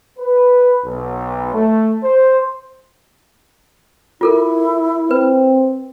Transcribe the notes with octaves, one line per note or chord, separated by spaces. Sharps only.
B4
B1
A3
C5
E4 F4 A4 A#4
C4 B4